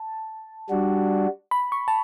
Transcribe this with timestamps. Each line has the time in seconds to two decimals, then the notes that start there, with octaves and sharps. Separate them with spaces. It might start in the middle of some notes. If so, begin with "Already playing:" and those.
Already playing: A5
0.69 G3 D4 F#4
1.51 B5
1.72 C#6
1.88 A5